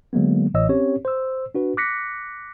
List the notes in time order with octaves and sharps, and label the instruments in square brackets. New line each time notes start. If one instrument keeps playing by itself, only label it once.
[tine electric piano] D3 F#3 G#3 A#3 B3
A1 A2 E3 C#5 D#5 E6
C4 C#4 G4 C#5
C5 E6
D4 F#4 B4
D6 F#6 A#6 B6 C#7